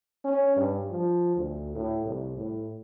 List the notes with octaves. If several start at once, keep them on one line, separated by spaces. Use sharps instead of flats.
C#4
G2
F3
D2
A2
C2
A2